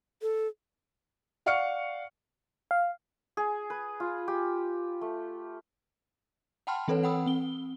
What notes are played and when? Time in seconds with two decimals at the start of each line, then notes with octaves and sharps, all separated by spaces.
0.22 A4
1.46 D5 F5 F#5 C#6 F6 C#7
2.71 F5
3.37 G#4
3.70 B4
4.00 F4
4.28 G4
5.01 A3
6.67 F#5 G5 A5 B5 C6 F6
6.88 E3 C4 A4 B4 C#5
7.03 F#5 G5 B5 D#6 E6
7.26 C4 G7